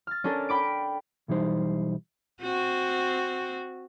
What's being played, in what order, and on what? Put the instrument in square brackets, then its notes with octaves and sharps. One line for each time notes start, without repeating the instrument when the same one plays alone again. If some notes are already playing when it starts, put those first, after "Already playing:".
[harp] F6 A6
C#4 D4 A4 A#4
G5 B5 D6 D7
[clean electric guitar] B1 E3 G3 D#4 C5
[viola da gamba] C4 F#4